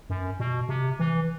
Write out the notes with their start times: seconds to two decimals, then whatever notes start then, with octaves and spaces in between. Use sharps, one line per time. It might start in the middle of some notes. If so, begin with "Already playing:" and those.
0.10 F#2
0.40 B2
0.69 C3
0.99 E3